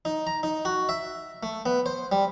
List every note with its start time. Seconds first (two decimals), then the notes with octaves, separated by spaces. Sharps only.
0.05 D#4
0.27 A#5
0.43 D#4
0.65 F#4
0.89 E5
1.43 A3
1.66 B3
1.86 C5
2.12 G3